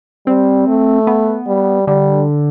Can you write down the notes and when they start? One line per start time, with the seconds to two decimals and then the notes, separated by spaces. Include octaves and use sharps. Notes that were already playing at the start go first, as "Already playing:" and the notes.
0.27 G3 C4
0.67 A3
1.07 B3
1.47 G3
1.87 D3 G3